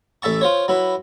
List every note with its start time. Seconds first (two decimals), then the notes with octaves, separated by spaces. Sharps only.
0.22 A1 A4 E5 A5 C#6
0.41 F4 C5 C#5
0.68 F#3 E4 B4